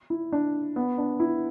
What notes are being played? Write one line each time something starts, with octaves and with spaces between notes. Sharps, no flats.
E4
D4
B3
D4
E4